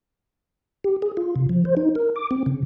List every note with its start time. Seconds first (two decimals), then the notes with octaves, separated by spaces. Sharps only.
0.84 G4
1.02 G#4
1.17 F4
1.36 C3
1.49 F3
1.65 C5
1.77 D#4
1.95 A#4
2.16 D6
2.31 C4
2.46 C#3